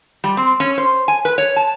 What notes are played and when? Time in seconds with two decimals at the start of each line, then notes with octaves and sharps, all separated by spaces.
0.24 G3
0.37 C4
0.60 C#4
0.78 C5
1.08 G#5
1.25 B4
1.38 C#5
1.56 A5